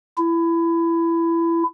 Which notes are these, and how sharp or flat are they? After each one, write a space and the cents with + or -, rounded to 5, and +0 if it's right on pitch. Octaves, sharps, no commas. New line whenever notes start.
E4 +20